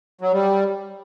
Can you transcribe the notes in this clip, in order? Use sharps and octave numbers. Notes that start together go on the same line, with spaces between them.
F#3
G3